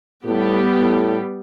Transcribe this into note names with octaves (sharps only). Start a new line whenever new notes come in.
A2 G3 B3 G4
A2